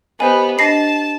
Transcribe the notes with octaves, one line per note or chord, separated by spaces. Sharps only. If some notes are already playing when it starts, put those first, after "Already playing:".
B3 G4 C5 D#5 G#5
D4 D#5 A5 A#6 C7